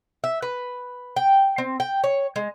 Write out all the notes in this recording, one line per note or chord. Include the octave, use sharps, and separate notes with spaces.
E5
B4
G5
C4
G5
C#5
G#3